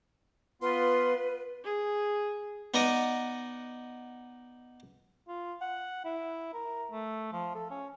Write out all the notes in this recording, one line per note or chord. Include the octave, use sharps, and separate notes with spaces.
B3 F4 B4 C6
G#4
B3 D#4 D5 D#5 F#5
F4
F#5
E4
A#4
A3
F3
A4
C#4